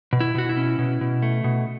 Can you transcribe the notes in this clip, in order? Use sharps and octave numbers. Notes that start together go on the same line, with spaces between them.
B2
E4
B2 F#4
E4
C#4
B2
B2
A3
B2